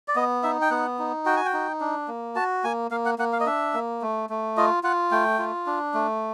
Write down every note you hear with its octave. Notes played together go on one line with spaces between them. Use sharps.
D5
B3 D#5
D#4 E5
G5
B3 F#5
D#4
F#4 G5
G#5
G5
D#4
D4
A#3
F#4 A5
A#3 G#5
A#3 F5
F#5
A#3 F#5
F5
D#5
D4 E5
A#3
A3
A3
F4 D#5
F4 F#5
A3 G5
F4
D4
A3